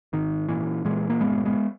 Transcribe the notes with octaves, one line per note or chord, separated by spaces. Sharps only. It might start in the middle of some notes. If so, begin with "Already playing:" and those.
G#1 D#3
A#2 E3
A#2 E3 G#3
A#3
G1 G#3 B3
G#3 B3